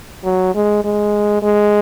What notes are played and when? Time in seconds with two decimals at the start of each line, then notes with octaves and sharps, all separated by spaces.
0.25 F#3
0.55 G#3
0.84 G#3
1.43 G#3